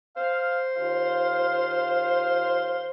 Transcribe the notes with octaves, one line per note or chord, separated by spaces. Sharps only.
C5 F5
D#2 F4 F5